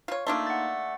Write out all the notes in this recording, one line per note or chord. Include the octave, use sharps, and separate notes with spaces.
F4 C#5
A3 A#3 D4 D#4 F4 C6
F#5 A6